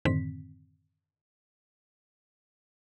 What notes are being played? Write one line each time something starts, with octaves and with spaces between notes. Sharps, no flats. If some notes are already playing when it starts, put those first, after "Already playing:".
F#2 A2 D3 D#3 C4 B6